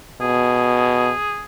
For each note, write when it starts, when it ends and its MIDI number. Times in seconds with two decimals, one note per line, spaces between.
0.21 1.10 47
0.21 1.43 68